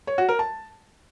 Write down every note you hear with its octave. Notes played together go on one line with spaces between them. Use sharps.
C#5
F#4
A#4
A5